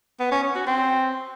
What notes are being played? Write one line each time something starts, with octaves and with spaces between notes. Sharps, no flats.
B3
C#4
C#4
F#4
C4